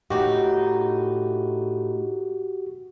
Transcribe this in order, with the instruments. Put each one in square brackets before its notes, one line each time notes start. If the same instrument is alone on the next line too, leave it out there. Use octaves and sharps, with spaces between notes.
[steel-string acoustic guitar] A2 D#4 [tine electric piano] F#4 G4